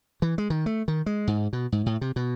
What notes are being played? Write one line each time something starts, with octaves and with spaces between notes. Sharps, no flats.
E3
G#3
D#3
A3
D#3
G#3
G#2
B2
G#2
A2
C3
B2